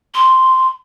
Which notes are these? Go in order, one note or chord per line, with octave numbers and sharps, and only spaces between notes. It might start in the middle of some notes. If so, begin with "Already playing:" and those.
C6